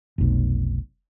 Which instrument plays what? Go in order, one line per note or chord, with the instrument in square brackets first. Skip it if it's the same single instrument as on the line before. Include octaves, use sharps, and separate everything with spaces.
[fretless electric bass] F1 B1